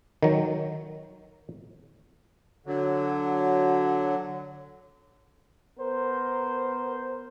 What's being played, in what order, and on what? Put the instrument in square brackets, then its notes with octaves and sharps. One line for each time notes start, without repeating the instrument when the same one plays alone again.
[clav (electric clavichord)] D#3 F#3
[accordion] D3 F#3
[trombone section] B3 A#4 C5